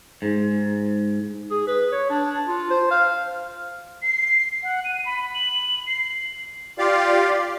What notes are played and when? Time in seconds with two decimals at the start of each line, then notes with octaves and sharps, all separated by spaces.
0.22 G#2
1.51 G#4
1.68 B4
1.92 C#5
2.10 D4
2.48 F4
2.70 C5
2.91 F5
4.02 C7
4.63 F#5
4.84 D#7
5.06 B5
5.35 F#7
5.87 C7
6.78 F4 G4 D5 F5